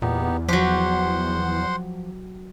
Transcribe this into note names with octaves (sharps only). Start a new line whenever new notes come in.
E2 A#2 B3 D#4 G4
F3 F#3 G4 C5 F#5 C6